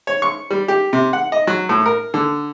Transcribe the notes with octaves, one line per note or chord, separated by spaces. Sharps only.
C#5
C#6
G3
G4
C3
F#5
D#5
F#3
A2
A#4
D3